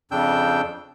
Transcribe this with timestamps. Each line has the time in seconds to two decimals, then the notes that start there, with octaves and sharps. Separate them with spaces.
0.11 F2 C#3 D4 G5 E6 G6